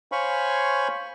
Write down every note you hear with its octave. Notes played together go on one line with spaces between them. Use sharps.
C5 C#5 F5 G#5 B5 C#6